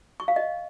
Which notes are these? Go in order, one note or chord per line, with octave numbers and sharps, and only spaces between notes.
C#6
F5
D#5